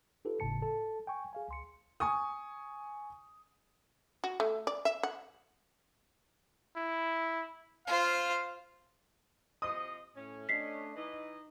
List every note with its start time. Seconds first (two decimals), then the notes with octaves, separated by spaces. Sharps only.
0.25 D#4 F4 G4 A4 B4
0.40 G1 A2 C#3 A5 C#7
0.62 A4 A5
1.07 G5 G#5 C#6
1.33 G#4 F5 G#5
1.49 C#2 C6 C#7
2.00 G#5 C#6 D#6
4.24 F#4
4.40 A3
4.67 D5
4.85 E5
5.03 F#5
6.76 E4
7.87 F4 C5 F5
9.62 C3 F3 D#5 D#6
10.16 A2 C#4
10.49 A3 D4 D#5 B6 C7
10.96 E3 D#4 D#5